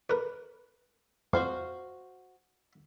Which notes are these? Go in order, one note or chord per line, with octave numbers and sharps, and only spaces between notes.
A#4 B4
F2 F#4 C5 F5